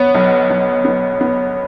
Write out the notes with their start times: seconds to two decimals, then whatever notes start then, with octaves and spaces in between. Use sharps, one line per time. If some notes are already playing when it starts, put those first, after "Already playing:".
Already playing: B3 C#5
0.14 B1
0.50 B1
0.85 B3
1.21 B3